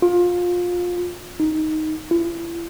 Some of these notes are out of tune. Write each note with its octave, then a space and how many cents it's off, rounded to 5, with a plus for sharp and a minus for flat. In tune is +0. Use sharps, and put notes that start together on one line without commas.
F4 +20
D#4 +5
E4 +40